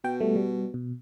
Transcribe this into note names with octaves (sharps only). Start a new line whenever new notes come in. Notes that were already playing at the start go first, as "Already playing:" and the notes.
B2 G5
G3 A3
G3
B2